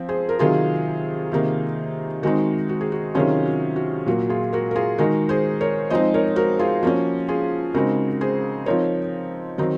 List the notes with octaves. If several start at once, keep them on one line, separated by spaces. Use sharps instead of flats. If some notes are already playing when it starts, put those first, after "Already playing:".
Already playing: F3 C4
G#4 C5
A#4
C3 D#3 F#3 F4 G#4
C3 D#3 A#3 D#4
D#3 G#3 C4 D#4 F#4
F#4
G#4
F#4
C3 D#3 F#3 C#4 F4 G#4
F#4
F#4
A#2 F#3 A#3 F#4
F4 G#4
F#4 A#4
A#4
F4 G#4
D#3 G#3 D#4 F#4 A#4
G#4 C5
A#4 C#5
F3 G#3 C4 D#4 C5 D#5
A#4 C#5
F#4 A#4
F4 G#4
F3 A#3 C#4 F#4
F4 G#4
C#3 G#3 C4 D#4 F#4 A#4
G#4 C5
F3 C4 D#4 A#4 C#5
D#3 F#3 C4 D#4